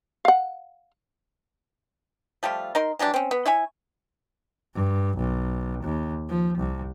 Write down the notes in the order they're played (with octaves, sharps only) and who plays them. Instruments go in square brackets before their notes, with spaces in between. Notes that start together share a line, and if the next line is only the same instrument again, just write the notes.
[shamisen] F5 F#5
[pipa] F3 G3 A3 F4
D#4 A#4 C6
E3 F#3 G3 D4
C4 C#4
B3
E4 C#5 E5 G#5
[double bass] G2
B1
D#2
F3
C2